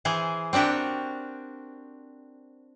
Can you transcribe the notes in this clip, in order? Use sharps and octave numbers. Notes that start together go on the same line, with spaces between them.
E3 G#4 C5
C4 D4 F#4 G4 A#4